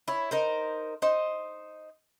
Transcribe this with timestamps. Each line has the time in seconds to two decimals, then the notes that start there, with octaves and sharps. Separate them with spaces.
0.08 E4 C#5
0.31 D#4 A#4 C5
1.02 D#4 C5